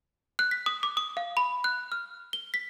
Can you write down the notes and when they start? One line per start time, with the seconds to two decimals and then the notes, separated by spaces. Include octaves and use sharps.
0.39 F#6
0.51 B6
0.66 D#6
0.83 D6
0.97 D#6
1.17 F5
1.37 B5
1.64 F#6
1.92 F6
2.33 G7
2.54 B6